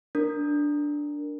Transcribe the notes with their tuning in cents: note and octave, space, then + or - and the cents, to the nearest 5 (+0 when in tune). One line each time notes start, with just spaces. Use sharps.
D4 +0 A#4 -5